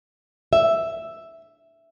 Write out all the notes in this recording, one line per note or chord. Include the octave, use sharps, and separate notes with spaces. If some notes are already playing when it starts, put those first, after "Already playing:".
E5